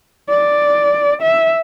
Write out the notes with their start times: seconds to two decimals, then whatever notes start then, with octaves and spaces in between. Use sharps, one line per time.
0.30 D5
1.22 E5